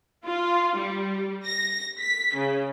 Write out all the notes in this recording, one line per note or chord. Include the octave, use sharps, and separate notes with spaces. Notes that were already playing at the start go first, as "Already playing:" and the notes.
F4
G3
A#6
B6
C#3